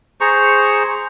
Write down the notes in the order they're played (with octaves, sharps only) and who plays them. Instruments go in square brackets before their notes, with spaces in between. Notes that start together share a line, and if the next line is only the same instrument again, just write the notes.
[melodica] G#4 C5 A#5 C#6